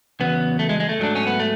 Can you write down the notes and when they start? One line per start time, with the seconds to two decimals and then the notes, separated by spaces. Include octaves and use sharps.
0.20 E2 C#3 F#3 B3
0.59 A3
0.69 G#3
0.80 G#3
0.89 A3
0.99 G#2 F#3 D4
1.15 C#4
1.27 B3
1.40 A3